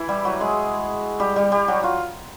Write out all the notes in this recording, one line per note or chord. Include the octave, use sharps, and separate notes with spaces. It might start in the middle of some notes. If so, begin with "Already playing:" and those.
Already playing: E3 E4
G3 G4
F#3 F#4
G#3 G#4
G3 G4
G3 G4
G3 G4
F#3 F#4
F4